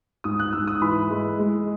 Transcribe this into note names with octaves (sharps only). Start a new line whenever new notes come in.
G#2 D#6
F#6
G#2 E6
D#6
E3 B5
G#3
G#3